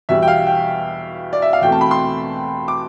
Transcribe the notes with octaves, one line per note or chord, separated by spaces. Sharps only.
E2 B2 G3 E5
G5
F5
G5
D5
E5
F5
E2 B2 A3 C4 G5
A5
B5
C6
D6